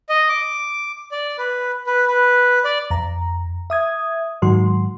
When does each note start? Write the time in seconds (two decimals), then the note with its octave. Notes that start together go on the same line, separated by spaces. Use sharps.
0.09 D#5
0.29 D6
1.11 D5
1.38 B4
1.87 B4
2.08 B4
2.64 D5
2.90 F2 A#5
3.70 E5 D#6 G#6
4.42 G#2 D#3 F#3 F#4 C6